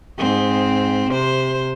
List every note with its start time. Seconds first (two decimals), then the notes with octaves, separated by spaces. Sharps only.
0.18 G#2 C4
1.11 C3 C5